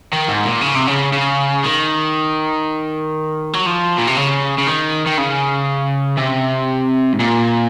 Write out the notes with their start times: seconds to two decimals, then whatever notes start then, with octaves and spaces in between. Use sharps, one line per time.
0.13 D#3
0.28 G#2
0.45 A#2
0.62 C#3
0.76 C3
0.88 C#3
1.13 C#3
1.64 D#3
3.53 F#3
3.66 F3
3.98 A#2
4.07 C3
4.17 C#3
4.58 C#3
4.67 D#3
5.06 D#3
5.18 C#3
6.18 C3
7.13 G#2
7.20 A#2